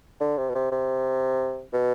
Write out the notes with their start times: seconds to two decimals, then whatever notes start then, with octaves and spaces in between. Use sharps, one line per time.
0.20 D3
0.38 C3
0.50 B2
0.55 C3
0.72 C3
1.73 B2